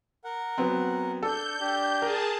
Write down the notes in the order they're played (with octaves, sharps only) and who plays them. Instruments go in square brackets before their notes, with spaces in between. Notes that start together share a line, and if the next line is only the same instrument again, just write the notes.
[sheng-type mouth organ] A#4 F#5
[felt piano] F#3 B3 C4
[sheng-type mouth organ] D4 [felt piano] A4 [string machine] G6
[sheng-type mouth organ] D4 G4
[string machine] G#4 A5 [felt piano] A#4